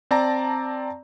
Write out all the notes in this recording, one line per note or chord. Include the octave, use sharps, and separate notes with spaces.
C4 D5 A5 A#5